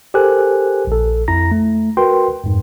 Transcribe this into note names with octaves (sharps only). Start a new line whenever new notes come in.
G4 A4 A#4 C5 G#5 F#6
A#1 A4
F2 E4 A#5 A#6
A3
F#4 A#4 B4 G5 C6
F2 G#2